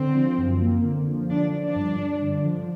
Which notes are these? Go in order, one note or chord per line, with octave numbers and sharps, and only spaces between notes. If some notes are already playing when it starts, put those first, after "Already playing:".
Already playing: D3 C4
F3
F#2
A#3
D3
F3
D3 D4
F3
D4
G2
G2
D3
F3